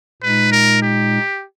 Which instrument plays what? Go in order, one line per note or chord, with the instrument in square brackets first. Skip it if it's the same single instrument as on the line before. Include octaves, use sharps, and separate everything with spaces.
[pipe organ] A#2 G#3 D#4 [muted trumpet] B4
[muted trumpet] A#4
G4